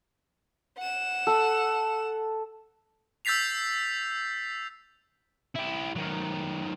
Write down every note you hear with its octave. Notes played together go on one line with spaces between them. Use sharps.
F#5 E7
A4
E6 G6 A6 B6 C7 F7
E4 G4
D#3 F#3